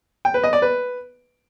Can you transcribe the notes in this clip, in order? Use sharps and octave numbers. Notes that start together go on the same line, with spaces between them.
G5
B4
D#5
D5
B4